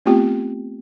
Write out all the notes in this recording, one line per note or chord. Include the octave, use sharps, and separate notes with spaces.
A3 B3 C4 F4 G4 G5